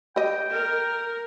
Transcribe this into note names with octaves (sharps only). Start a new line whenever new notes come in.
G4 D#5 G5
A#4